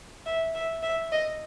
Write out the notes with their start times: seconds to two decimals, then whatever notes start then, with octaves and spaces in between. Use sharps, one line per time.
0.26 E5
0.55 E5
0.83 E5
1.12 D#5